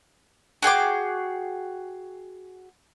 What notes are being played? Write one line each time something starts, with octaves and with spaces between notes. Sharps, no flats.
F#4 G#4 G5 D6